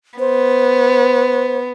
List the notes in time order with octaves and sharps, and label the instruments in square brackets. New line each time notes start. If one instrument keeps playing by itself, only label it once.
[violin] B3 [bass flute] C5